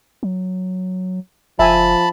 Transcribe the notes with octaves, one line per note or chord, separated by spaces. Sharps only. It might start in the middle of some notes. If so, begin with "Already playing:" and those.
F#3
F#1 F3 E5 G#5 A5 B5